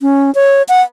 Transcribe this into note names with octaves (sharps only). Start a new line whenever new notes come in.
C#4
C#5
F#5